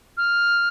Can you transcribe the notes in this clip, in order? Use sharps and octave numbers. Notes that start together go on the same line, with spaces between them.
F6